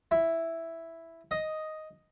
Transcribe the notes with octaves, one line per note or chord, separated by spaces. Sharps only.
E4
D#5